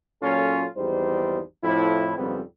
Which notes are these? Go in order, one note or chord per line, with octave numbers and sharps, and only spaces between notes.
A#2 F#3 C#4 F4 A4
G#1 E2 G3 D#4 C5
F2 A2 F3 E4
G#1 F2 C#3 G3 B3 C4